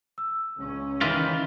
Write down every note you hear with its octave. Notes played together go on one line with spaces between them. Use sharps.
E6
C#2 C#4
D#3 E3 F4 B6 D7 D#7